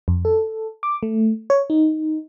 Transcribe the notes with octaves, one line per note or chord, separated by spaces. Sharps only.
F2
A4
D6
A3
C#5
D#4